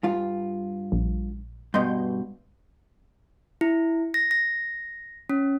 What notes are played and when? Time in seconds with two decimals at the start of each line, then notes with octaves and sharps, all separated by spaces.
0.03 G2 F4
0.92 A#1
1.74 G2 B2 D#5 C6 G6
3.61 E4
4.14 A#6
4.31 A#6
5.30 C#4